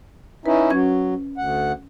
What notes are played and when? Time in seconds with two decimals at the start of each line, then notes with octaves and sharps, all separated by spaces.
0.46 C#4 D#4 E4 B4
0.70 F#3 C#4 G#6
1.38 D2 F#5